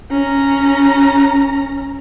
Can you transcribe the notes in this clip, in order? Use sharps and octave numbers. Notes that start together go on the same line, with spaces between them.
C#4 A#5